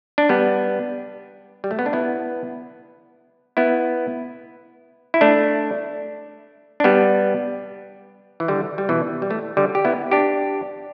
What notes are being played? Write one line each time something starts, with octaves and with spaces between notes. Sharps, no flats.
D4
G3 B3
G3
A3
B3
D4
B3 E4
B3 E4
E4
A3 D4
D4
G3 B3
E3
D3 G3
G3
B2 E3
G3
E3 A3
D3 G3
G4
B3 E4
D4 G4